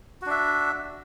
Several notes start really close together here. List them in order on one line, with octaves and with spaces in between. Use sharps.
F#4 D4 E5